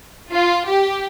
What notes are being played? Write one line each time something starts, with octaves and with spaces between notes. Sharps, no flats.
F4
G4